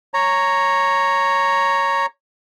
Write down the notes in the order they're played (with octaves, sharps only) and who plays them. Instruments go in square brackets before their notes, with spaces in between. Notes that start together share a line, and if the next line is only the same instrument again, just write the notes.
[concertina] C#5 A#5